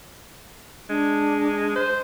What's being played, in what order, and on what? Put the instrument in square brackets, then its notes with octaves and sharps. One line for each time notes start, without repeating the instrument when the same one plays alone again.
[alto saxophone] G#3 [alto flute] D4
[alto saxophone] C5